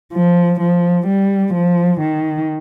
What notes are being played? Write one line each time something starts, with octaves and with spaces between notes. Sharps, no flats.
F3
F3
G3
F3
D#3